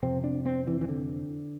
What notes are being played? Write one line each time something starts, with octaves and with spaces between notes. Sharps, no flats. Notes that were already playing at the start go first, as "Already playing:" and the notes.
F2 C3 C4
D4
C4
E3
E3
D3